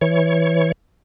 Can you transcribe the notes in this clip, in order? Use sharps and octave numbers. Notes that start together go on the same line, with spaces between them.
E3 C#5